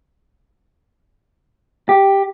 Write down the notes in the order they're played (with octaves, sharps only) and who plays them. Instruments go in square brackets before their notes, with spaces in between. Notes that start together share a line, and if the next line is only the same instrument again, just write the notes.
[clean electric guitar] G4